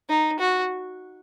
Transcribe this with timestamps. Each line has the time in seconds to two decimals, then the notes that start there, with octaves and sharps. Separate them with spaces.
0.09 D#4
0.40 F#4